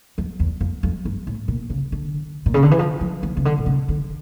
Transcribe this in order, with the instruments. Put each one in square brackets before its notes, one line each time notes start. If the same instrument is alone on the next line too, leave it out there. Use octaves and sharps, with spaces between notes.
[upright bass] F2
E2
F2
F2
G2
A2
A#2
C#3
D3
A#2
C#3
D3
E3
F3
F3
E3
C#3
D3
A#2
C#3
D3